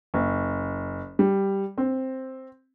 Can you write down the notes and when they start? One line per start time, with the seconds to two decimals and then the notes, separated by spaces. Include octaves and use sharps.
0.14 F#1
1.19 G3
1.78 C4